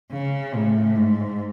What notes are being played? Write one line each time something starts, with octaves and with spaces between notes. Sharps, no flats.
C#3
A2
G#2